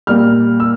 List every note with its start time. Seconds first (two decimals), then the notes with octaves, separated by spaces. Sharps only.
0.07 A#2 G3 A#3 F6
0.60 E6